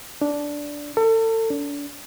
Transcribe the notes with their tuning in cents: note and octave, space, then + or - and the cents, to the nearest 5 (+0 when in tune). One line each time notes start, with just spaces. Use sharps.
D4 -10
A4 +35
D4 -40